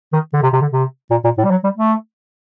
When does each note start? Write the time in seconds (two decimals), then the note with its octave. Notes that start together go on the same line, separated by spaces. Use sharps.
0.13 D#3
0.33 D3
0.43 C3
0.53 C3
0.61 D3
0.72 C3
1.11 A#2
1.24 A#2
1.38 A2
1.44 G3
1.51 F#3
1.64 G3
1.77 A3